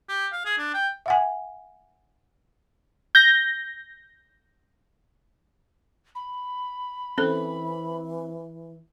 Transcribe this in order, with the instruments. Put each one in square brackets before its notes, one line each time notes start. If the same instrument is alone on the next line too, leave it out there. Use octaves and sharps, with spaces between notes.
[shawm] G4
F5
G#4
D4
G5
[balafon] E5 F#5 G#5
[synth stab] G6 A#6
[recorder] B5
[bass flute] E3 [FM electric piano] C4 [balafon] C#4 A4